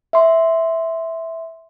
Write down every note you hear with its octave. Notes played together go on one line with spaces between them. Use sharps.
E5 C6